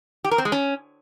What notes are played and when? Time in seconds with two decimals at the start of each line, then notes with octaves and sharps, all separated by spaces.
0.24 G4
0.31 A#4
0.38 C4
0.45 G#3
0.52 C#4